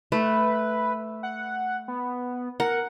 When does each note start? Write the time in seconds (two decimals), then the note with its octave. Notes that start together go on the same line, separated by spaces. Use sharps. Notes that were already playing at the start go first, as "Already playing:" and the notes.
0.12 A3 B4
1.23 F#5
1.88 B3
2.60 A#4 F#5